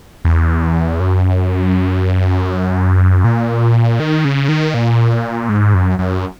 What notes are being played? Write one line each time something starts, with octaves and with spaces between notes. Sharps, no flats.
E2
F#2
A#2
D#3
C#3
D#3
A#2
G#2
F#2
F#2